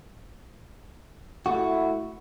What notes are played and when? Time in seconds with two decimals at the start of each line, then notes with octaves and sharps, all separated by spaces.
1.46 A3 E4 F#4